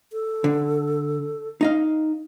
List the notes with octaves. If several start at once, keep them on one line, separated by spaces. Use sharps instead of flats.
A4
D3
D#4 D#5 F5